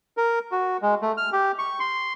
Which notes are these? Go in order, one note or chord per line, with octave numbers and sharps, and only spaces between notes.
A#4
F#4
G#3
A3
F6
G4
C#6
C6